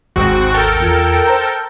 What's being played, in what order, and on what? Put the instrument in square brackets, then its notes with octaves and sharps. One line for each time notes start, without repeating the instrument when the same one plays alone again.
[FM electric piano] G#1 D#2 [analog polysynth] G#2 C4 F#4
[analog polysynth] A4 A#4 G5
[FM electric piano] E2 F4 G#6
C5 A#5 G6